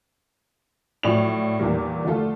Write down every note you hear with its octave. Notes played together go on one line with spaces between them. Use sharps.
A2 F3 F#3 D5 F7
E2 A#2 D#3 G3 A#3
D3 F3 A3 F4 A4